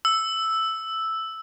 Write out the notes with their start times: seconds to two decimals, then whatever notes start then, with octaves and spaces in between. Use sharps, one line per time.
0.05 E6